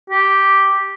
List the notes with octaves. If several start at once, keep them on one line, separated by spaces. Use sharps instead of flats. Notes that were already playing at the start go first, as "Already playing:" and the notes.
G4